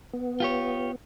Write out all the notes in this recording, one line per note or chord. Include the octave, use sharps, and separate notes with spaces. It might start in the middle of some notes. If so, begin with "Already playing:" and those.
B3
F4 G4 C#5